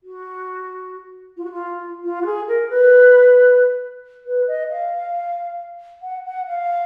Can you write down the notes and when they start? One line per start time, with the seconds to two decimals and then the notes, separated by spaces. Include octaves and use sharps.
0.04 F#4
1.37 F4
1.44 F#4
1.52 F4
2.04 F4
2.22 F#4
2.26 G#4
2.48 A#4
2.70 B4
4.26 B4
4.48 D#5
4.70 F5
6.03 F#5
6.26 F#5
6.48 F5